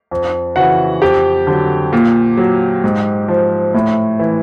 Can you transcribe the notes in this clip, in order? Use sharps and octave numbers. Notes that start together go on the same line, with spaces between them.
F2
C#3 E3 F#4 F#5
F2 G4 G5
D3 F#3
A#2
F#3
G#2
F3
A2
E3